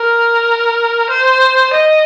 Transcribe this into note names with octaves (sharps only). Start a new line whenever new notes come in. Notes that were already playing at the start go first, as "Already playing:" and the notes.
Already playing: A#4
C5
D#5